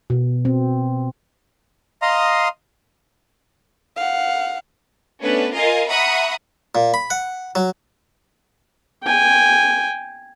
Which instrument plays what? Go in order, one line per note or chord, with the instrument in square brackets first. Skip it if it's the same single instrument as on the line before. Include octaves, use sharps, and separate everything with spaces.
[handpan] B2
C4
[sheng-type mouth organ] D#5 F5 A#5 C6 D#6
[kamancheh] F5 F#5
[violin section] A3 B3 C#4 D4 B4
F4 A#4 D#5 F5 G#5
E5 F#5 A#5 B5 C#6 D#6
[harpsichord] A#2
B5
F#5
F#3
[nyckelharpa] G5 G#5